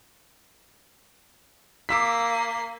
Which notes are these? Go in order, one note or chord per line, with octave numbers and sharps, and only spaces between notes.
A#3 D6 E6 B6 C7